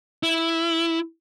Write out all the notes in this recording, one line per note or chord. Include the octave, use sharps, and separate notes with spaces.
E4